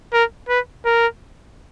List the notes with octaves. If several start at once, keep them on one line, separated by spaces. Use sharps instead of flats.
A#4
B4
A#4